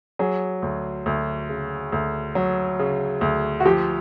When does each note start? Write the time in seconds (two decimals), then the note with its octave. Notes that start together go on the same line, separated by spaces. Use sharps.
0.19 F#3 G#4
0.62 D2
1.06 D2
1.49 C#3
1.92 D2
2.35 F#3
2.79 C#3
3.21 D2
3.60 F#4
3.65 F3 G4